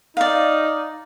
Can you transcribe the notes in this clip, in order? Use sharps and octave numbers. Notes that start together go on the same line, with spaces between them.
D#4 D5 F5